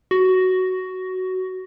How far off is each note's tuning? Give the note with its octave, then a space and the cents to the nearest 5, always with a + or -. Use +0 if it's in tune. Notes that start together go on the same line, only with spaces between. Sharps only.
F#4 +10